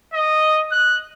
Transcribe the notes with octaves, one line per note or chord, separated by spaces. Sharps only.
D#5
F#6